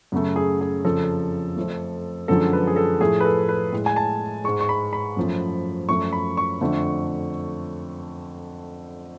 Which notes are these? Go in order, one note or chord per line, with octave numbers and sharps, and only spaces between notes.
F#2 C#3 F#3 A3
G#4
G#4
F2 C#3 F3 A4
F2 F3 A3
F#2 D3 F3 G#3 A4
B4
G#4
A4
A2 F3 A3 G#4
B4
A4
B4
A2 G#3
G#5
A5
G#2 G#3 C#6
C#6
B5
B5
F#2 F3 A3
F#2 F3 A3 C#6
B5
C#6
F2 D3 F3 A3